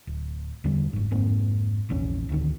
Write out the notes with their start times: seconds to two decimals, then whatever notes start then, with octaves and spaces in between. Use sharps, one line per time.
0.07 D1
0.64 E2 D3 G3
0.93 F#1 G#2
1.11 F1 G#2 A#3 C4
1.89 F1 A#1 E2 C#4
2.29 D1 A1 D2 D#3